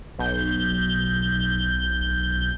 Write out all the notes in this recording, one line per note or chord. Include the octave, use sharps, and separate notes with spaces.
B1 G6